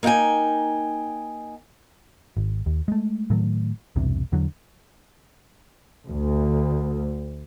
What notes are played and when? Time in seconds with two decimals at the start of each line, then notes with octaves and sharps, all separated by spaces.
0.03 A#3 D#4 F5 G5 G#5
2.37 G#1
2.66 D#2
2.88 G#3 A3
3.30 A2 D#3 F#3 A3
3.96 B1 E2 G2 C3
4.32 E2 D3 F#3
6.09 D2